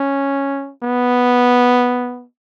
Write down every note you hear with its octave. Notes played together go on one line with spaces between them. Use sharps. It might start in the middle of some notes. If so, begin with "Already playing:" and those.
Already playing: C#4
B3